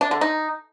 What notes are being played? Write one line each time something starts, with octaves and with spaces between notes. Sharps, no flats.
D4
D3
D#4